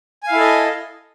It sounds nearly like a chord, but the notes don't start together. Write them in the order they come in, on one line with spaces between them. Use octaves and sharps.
G#5 F5 E4 A4 D#5